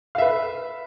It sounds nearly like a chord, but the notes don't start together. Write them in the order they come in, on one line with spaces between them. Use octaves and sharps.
F5 E5 B4